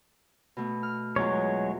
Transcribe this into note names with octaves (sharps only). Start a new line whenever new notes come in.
B2 A3
F6
E2 F#3 G#3 F4 C#5